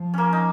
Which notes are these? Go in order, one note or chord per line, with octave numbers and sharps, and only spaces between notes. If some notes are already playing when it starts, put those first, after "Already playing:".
Already playing: F3
A#3 C#4
D#4